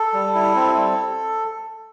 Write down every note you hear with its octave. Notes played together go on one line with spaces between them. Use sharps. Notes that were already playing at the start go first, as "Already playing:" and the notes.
Already playing: A4
G3
E4
C4
G3